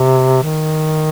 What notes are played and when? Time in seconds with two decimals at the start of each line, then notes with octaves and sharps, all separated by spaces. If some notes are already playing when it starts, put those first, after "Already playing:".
Already playing: C3
0.43 D#3